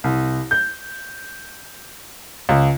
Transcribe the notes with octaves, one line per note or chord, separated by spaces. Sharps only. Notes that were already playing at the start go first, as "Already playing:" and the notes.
C2
G6
C#2